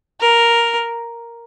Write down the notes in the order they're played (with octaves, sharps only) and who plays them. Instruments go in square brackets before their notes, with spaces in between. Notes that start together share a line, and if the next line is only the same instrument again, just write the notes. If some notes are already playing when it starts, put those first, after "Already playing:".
[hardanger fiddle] A#4